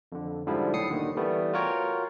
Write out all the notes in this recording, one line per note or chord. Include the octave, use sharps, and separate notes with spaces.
F2 D3
G#2 D3 F3 G3 E4
B1 A2 D#6 C7 C#7
D#2 D3 D#3
E3 G3 A3 B3
F4 F#4 A#4 C#5 G5